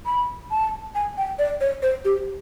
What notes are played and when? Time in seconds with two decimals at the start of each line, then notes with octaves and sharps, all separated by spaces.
0.06 B5
0.51 A5
0.95 G#5
1.18 G5
1.39 D5
1.61 C#5
1.83 C5
2.05 G4